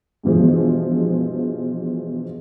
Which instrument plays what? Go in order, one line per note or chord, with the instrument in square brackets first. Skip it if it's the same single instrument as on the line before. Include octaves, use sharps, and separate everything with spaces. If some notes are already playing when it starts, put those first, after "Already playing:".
[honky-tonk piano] G2 B2 E3 F3 G#3